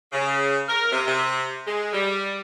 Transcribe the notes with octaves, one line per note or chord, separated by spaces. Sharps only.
C#3
A#4
C3
C3
G#3
G3